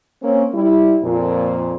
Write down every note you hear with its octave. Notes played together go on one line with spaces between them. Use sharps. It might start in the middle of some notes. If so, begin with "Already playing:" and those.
A#3 C4 C#4
G3 E4
F2 A#2